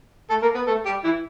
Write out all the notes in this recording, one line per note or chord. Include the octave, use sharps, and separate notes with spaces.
A3 A4
A#3 A#4
B3 B4
A3 A4
G3 G4
E3 E4